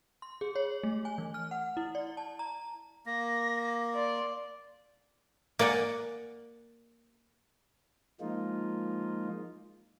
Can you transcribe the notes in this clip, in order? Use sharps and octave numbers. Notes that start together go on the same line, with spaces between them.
C6
G#4
C#5
A3
G#5
E3
F6
F#5
E4
D5
A5
A#5
A#3 A#6
D5 C6
A#3 D5 F#5 G#5
F3 G#3 A#3 D#4 F4